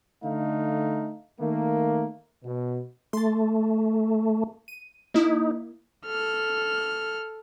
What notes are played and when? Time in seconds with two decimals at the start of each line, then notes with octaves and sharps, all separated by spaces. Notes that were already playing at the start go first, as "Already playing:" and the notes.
0.23 D3 A3 D#4 F5
1.39 D#3 A3 A#3
2.44 B2
3.13 A3 C6 A6
4.68 D#7
5.14 A#3 D#4 E4
6.06 A4 F6